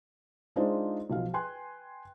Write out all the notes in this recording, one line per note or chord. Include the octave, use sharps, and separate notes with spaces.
G#3 D4 D#4 F4 C5 D#5
B1 F3 F5
B4 G5 G#5 C6 F#6